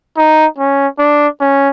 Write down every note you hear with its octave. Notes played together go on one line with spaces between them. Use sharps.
D#4
C#4
D4
C#4